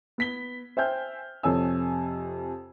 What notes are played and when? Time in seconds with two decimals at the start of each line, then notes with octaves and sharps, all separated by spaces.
0.18 B3 B6 G7
0.77 C5 E5 G5 G#5 F6 G6
1.43 F2 C3 A4 C#5 G#5 E6